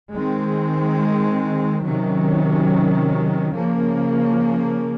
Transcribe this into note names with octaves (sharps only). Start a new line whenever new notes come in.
D#3 G#3 C4
C3 D#3 F#3 C#4
C#3 F3 A#3 C#4